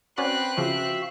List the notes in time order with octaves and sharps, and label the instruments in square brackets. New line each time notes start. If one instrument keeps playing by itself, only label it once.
[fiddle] C4 F#6 [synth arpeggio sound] C#4 F#4 D5 [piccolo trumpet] B4
[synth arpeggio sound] C#3 F3 [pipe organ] F#4 F5 [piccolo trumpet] E5